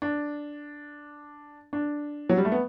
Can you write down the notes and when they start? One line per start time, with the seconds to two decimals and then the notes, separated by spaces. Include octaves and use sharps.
0.02 D4
1.73 D4
2.29 F#3
2.37 G3
2.45 A3
2.52 B3